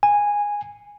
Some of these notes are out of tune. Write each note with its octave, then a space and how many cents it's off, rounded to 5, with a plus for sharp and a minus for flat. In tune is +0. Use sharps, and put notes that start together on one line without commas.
G#5 -10